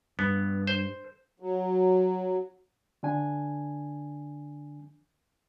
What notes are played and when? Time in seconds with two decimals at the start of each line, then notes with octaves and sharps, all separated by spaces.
0.19 G2 B3
0.67 C5
1.40 F#3
3.03 D3 D4 G#5